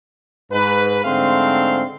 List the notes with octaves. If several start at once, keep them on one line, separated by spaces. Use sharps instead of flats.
G#2 B4
G#2 D3 A3 C4 F5 C6